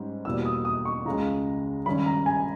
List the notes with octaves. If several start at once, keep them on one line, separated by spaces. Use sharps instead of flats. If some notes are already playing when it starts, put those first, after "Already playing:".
Already playing: G#2 G3 C#4
E2 B2 G3 A#3 E6
D#6
D#6
C#6
C#2 C#3 G#3 C#4 A#5
G#1 G2 G3 C#4 B5
A#5
G#5